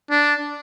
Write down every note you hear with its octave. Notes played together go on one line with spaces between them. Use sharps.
D4